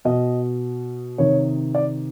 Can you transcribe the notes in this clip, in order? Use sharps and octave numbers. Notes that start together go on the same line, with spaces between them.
B2 D#5
C3 D#3 C#5
D5